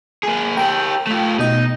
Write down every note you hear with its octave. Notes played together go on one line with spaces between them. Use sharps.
A#3 G#4
G4 A#4 G5
A3 F4
B2 D#4 D#5